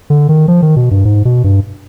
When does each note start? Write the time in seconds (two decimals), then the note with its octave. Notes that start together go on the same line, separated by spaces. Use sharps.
0.10 D3
0.29 D#3
0.48 F3
0.62 D#3
0.76 B2
0.91 G2
1.05 G#2
1.25 B2
1.44 G2